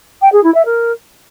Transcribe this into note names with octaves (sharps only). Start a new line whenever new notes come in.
G5
G#4
E4
E5
A#4